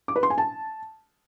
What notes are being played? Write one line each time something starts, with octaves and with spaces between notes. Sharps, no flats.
D6
B4
C6
G#5
A5